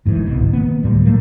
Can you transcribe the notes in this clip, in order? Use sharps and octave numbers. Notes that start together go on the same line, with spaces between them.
G1 G#2 D#3 E3
G1 C2 B2
D#3 A#3 B3
D2 A2 G3
A#2 F#3 A3 A#3